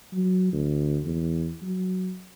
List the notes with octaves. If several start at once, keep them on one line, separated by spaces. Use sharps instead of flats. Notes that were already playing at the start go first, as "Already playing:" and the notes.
F#3
D2
E2
F#3